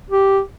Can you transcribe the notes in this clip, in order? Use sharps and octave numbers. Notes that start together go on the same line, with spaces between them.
G4